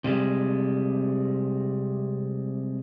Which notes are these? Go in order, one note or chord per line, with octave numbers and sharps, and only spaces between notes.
C3 G3 G#3